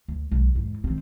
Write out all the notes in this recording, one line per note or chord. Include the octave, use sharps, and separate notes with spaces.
D2
B1
E2 G#2
D#3 C4